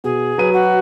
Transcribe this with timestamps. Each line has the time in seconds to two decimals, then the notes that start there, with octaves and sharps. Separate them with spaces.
0.04 B2 G#4
0.38 F#3 B4 D#7
0.53 F#4